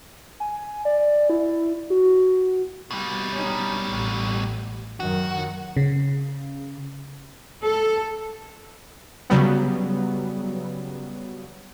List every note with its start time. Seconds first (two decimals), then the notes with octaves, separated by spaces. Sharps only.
0.40 G#5
0.85 D5
1.30 E4
1.90 F#4
2.91 B2 G3
3.33 C#4 D#4
3.88 A1
5.00 F#2 D#3 F#4
5.77 C#3
7.64 A4
9.30 C#3 F#3 G3 B3